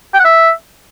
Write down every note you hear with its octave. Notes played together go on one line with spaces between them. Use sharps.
G5
F#5
E5